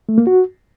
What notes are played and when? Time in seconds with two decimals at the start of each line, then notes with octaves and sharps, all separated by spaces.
0.09 A3
0.18 A#3
0.27 F#4